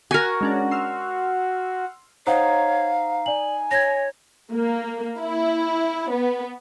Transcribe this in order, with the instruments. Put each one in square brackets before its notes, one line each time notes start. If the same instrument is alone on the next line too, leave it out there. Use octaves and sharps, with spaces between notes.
[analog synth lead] F#4 [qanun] A#4 G#5
[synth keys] G#3 C#4 D4
C6 E6 F6
[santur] D#4 [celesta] C5 F#5 [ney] C#5 [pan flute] F5
[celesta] D5 F#7 [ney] G#5
[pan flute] C#5 [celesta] G#6 A#6
[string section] A#3
E4
B3